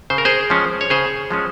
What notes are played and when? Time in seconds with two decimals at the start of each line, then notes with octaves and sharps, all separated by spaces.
0.10 C#3 C5
0.18 A#4
0.25 G#4 C5
0.50 F3 G#3 C#4
0.81 C#5
0.90 C#3 G#4 C5
1.31 F3 G#3 C#4